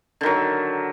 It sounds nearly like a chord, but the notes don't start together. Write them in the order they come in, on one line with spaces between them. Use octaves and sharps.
D3 D#3 F#3